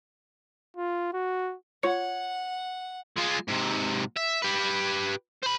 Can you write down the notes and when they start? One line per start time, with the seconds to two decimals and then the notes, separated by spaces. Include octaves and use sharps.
0.77 F4
1.13 F#4
1.83 F4 C#5 F#5 C#6 C#7
3.18 G#3 F4
3.48 G#2 C3
4.17 E5
4.42 G4 B4
5.43 C5 B5